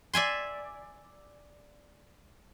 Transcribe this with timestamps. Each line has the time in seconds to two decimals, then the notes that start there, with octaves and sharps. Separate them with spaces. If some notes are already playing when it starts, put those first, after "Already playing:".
0.13 D5 E5 G#5 C6